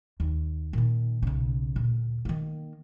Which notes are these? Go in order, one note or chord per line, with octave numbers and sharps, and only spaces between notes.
D#2
A#2 D#3
B1 C#3
D2 A#2
D#3 A#3